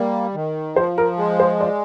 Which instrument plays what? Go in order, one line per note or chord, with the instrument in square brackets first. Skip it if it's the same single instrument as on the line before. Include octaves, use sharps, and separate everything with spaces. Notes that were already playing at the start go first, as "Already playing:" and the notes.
Already playing: [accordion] G3 A#3
D#3
[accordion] F3 [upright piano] C5
[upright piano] A#4
[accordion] G#3
[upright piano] C5
D5